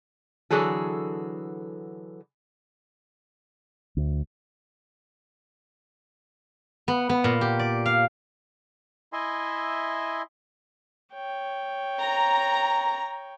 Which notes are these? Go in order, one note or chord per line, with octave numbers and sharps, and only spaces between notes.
D3 E3 F#3 G#4 A4
D2
B3
B3
A#2
G4
D5
F5
E4 D#5 E5 G#5 C6
C#5 G5
A#5